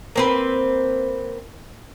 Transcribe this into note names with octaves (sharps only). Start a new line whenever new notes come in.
A#3 C4 B4